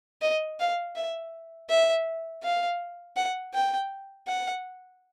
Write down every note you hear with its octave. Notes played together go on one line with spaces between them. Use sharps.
D#5
F5
E5
E5
F5
F#5
G5
F#5